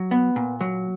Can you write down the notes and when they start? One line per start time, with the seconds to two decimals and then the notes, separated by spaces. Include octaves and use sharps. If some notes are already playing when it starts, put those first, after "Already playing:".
Already playing: F#3
0.11 B3
0.36 A#2
0.61 F#3